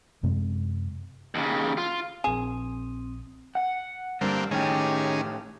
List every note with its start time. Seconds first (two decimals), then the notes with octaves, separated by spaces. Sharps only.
0.23 F#2 C3 G#3 C4
1.35 D#2 C#3
1.78 F4
2.24 A#1 C4 G#4 D#6
3.55 F#5
4.21 G2 D3 A#3 C4
4.51 A2 D#3 C#4 G4 G#4